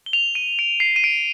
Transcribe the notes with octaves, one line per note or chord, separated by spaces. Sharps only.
G7
F7
D#7
D7
C7
D#7
D7